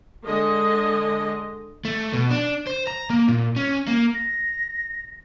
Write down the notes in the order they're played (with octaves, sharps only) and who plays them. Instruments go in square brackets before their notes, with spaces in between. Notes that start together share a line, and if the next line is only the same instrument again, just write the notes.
[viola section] D3 G#3 D#5
[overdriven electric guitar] A3
B2
D4
C5
A#5
A#3
A#2
C#4
A#3
[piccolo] A#6